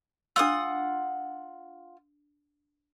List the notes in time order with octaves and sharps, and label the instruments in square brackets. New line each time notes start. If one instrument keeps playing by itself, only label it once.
[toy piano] D4 E6 [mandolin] F4 F#5 D#6